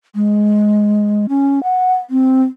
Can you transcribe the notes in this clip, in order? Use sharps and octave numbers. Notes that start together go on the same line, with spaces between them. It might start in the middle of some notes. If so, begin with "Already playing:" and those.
G#3
C#4
F#5
C4